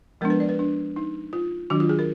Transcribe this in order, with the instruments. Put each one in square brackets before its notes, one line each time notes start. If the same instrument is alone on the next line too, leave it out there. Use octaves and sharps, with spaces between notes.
[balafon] F3 G#3 B3 D4 A#4
B4
D5
B4
D4
D#4
F4
D#3 F#3 D4 F#4
F4
G#4
A#4